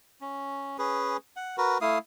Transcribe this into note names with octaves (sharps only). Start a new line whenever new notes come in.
C#4
C#4 G#4 B4
F#5
F#4 A#4 B4
A3 E4 F5 D#6